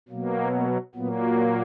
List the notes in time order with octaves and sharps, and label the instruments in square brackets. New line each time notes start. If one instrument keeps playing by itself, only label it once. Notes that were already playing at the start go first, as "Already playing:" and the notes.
[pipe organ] B2 F#3 A#3
A#3
A#2 F#3 A#3 B3